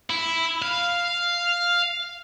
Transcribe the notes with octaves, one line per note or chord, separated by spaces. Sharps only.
E4
F5